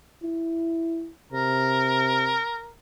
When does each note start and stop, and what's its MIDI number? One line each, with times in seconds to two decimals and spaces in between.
0.23 1.10 64
1.33 2.40 48
1.33 2.71 70